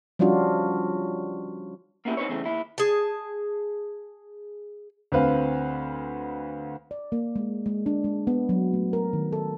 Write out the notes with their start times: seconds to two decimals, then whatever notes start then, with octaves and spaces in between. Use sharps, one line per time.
0.19 F3 G3 C#4 D4 F4 F#4
2.05 A#3 B3 C#4 E4 F4 G4
2.17 C4 D#4 B4 C#5
2.29 E2 C#3 E3 A3 C4
2.44 D#2 E4
2.78 G#4 A5
5.12 D2 C4 B4 F5
6.91 D5
7.12 A#3
7.36 G#3
7.66 G#3
7.86 D4
8.04 G#3
8.27 B3
8.49 F#3
8.74 A3
8.93 A#4
9.13 D#3
9.33 A4